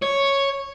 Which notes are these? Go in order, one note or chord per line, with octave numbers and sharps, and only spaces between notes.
C#5